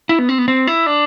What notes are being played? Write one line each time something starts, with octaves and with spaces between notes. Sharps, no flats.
E4
B3
C4
B3
C4
E4
D4